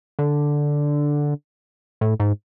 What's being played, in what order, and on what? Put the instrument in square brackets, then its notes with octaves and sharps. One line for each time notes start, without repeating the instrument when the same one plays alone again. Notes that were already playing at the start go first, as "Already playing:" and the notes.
[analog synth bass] D3
A2
G#2